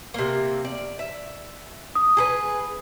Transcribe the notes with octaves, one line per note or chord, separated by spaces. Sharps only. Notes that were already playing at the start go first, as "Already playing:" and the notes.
C3 A#3
D5
E5
D#6
G#4 A4 B4